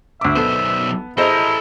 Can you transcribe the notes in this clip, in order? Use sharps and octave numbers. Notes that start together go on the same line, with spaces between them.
D2 E5 D6
B1 B3 A4 C5
E4 G#4 A4 C5 D#5 A#5